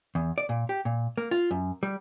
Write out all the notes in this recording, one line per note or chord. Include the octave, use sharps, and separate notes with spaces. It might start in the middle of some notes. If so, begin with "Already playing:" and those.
E2
D5
A#2
G4
A#2
A#3
F4
F#2
G3